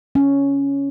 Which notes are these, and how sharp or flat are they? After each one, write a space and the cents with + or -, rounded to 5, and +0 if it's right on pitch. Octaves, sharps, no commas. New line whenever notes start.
C#4 +5